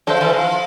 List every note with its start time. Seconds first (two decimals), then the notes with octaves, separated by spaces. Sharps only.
0.07 F3 D4 A4 C5 E5
0.21 E3
0.33 F3